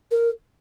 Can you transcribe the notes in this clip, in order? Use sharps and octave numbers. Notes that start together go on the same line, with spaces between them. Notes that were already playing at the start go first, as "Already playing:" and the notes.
A#4